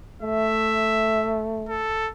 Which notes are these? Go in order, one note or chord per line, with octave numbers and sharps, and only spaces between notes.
A3 E5
A4